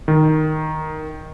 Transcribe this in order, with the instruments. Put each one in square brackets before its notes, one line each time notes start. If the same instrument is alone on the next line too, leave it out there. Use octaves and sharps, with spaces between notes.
[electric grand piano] D#3